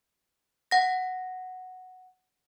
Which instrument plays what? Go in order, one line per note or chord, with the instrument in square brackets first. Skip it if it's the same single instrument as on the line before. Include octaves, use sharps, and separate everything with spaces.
[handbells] F#5 A#6